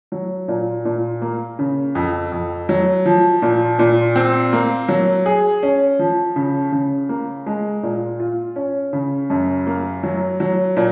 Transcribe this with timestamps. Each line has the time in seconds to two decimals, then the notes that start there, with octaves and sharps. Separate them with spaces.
0.12 F#3
0.48 A#2
0.85 A#2
1.22 A#3
1.59 C#3
1.95 F2
2.32 F2
2.69 F#3
3.05 F3
3.42 A#2
3.79 A#2
4.16 C4
4.53 A#3
4.88 F#3
5.26 G#4
5.63 C#4
5.99 F3
6.36 C#3
6.72 C#3
7.09 A#3
7.46 G#3
7.83 A#2
8.20 F4
8.56 C#4
8.93 C#3
9.30 F#2
9.67 A#3
10.03 F#3
10.40 F#3
10.77 A#2